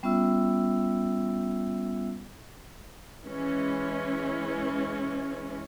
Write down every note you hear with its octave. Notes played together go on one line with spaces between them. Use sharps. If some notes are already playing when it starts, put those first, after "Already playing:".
G3 B3 C#4 F4 E5 E6
E3 G#3 C#4